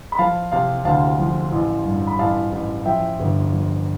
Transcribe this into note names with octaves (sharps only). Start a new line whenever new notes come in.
B5
F3 F5 A5
C3 F5 A5
D2 F5 A5
F3
A1
G2
B5
A1 F5 A5
A1
F3 E5 G5
G1
F3